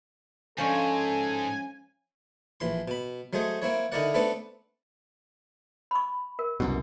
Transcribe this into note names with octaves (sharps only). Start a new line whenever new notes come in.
G#2 F3 C#4 A4 G#5
A#1 E3 C6
B2 B5
F#3 G#3 A3 G#4 C5
A#3 C4 E4 C#5
D3 D#4 E4 A#4 D5 F#5
A3 B3 C4 D4 A4 B4
B5 C#6
A#4
C2 F#2 B2